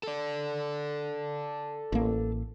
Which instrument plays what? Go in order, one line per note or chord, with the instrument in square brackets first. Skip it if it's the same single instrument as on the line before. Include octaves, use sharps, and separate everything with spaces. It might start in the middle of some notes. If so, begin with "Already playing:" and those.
[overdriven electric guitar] A4 D5
[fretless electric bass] A1 A#3